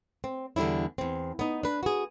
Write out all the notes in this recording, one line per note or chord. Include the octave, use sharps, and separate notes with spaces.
C4
E2 D3 G3 D4 E4
E2 C4
B3 D#4
D4 B4
F#4 G#4